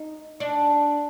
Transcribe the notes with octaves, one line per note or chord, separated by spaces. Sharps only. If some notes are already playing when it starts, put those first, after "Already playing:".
Already playing: D#4
D4